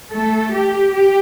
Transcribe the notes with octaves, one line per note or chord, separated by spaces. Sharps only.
A3 A4
G4
G4